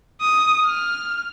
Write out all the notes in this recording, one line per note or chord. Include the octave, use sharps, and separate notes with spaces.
D#6
F6